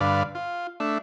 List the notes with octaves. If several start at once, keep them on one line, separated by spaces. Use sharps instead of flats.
G2 D3 B4 D5 F5
F4
A3 D4 E5